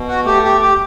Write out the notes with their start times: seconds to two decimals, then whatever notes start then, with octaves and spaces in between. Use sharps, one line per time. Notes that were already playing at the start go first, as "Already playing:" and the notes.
Already playing: B2
0.08 F#4
0.25 A3 G4
0.44 G4
0.61 G4